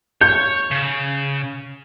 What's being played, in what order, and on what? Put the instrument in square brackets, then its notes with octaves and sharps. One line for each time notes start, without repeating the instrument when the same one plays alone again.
[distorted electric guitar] C#5 [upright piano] G6
[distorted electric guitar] C#3